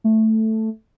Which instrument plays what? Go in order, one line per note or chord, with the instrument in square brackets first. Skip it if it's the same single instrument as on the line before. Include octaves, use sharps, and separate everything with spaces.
[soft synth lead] A3